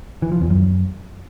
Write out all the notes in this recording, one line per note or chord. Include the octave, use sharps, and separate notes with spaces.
E3
F3
E2
F#2